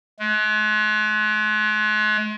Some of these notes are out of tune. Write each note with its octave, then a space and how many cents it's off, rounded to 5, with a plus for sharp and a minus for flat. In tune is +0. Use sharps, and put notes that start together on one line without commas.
G#3 +40